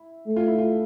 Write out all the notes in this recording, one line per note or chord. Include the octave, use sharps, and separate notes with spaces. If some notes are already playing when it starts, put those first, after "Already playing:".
Already playing: E4
A3
F4
E4
F4